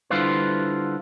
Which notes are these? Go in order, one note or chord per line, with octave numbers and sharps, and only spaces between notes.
D3 G3 E4 F4 B4 C5